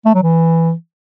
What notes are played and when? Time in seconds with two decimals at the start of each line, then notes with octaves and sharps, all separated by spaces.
0.06 A3
0.14 F#3
0.23 E3